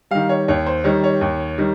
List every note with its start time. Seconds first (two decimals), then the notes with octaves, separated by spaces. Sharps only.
0.11 D#3 G3 F5
0.29 C#5
0.48 D#2 C#5
0.66 C5
0.84 D#3 G3 C#5
1.04 C#5
1.21 D#2
1.58 D#3 G3